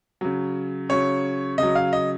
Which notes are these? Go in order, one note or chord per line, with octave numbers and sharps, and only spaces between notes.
C#3 F#3
C#3 F#3 C#5
C#3 F#3 D#5
F5
D#5